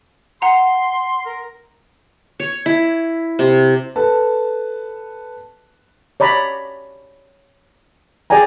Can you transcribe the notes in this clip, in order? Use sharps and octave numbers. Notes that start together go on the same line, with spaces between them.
F#5 A#5 C6
A#4
C#5
E4
C3
A4 B4 A5
C#5 D5 A#5 B5
G#4 D5 G5 G#5 A#5